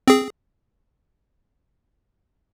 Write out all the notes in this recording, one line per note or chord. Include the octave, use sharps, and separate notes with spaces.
C4 G#4